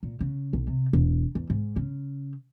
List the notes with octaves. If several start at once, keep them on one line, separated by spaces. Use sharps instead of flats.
A#2
C#3
B1
C3
E1
E2
G#2
C#3